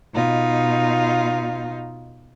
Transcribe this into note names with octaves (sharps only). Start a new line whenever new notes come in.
B2 D#4 F4